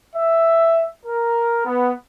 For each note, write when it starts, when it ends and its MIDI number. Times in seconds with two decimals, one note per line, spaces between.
0.16 0.86 76
1.04 1.63 70
1.65 1.92 59